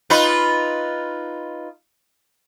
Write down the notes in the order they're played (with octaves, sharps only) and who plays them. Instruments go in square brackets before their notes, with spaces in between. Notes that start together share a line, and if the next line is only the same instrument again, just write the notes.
[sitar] D#4 F4 B4